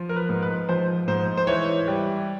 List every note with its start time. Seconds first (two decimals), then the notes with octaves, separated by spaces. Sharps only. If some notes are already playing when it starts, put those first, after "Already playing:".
Already playing: F3
0.09 A#4
0.16 B4
0.29 G#2
0.42 B4
0.69 F3 C5
1.08 G#2 C5
1.37 C5
1.47 E3 C#5
1.88 G3